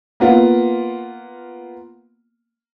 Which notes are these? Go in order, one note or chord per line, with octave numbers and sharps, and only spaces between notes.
A#3 B3 F4